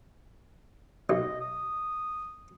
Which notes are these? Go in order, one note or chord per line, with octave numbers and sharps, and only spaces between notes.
B1 D#5
D#6